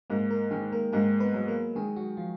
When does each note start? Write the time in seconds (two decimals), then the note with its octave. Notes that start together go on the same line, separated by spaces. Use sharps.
0.10 G#2 A#3 A#4
0.30 A#3 A#4
0.51 D#3 G#3 G#4
0.72 A#3 A#4
0.93 G#2 A#3 A#4
1.20 B3 B4
1.34 F#3
1.48 A#3 A#4
1.75 D#3 G#3 G#4
1.96 F#3 F#4
2.17 F3 F4